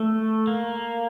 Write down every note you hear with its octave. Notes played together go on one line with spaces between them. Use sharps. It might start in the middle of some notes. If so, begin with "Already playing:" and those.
Already playing: A3
A#3